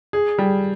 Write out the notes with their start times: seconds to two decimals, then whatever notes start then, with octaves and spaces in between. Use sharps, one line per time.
0.13 G#4
0.38 G3